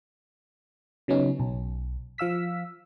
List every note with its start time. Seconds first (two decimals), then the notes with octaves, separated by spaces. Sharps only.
1.08 C#3 F#3 B3 C#4 D#4
1.40 B1
2.18 F3 F5 E6 B6